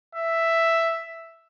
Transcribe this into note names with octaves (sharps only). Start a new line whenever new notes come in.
E5